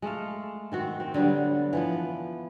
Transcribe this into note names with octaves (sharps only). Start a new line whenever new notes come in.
G#3 A3 A4 F5
D#3 C4 F#4
C4
D3 F#3 G3 B3
E3 F3 B3